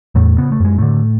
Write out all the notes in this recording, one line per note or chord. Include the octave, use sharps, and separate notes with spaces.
E2 A2 A3
C#3 B3
A3
F#2 G#3
A2 D3 A3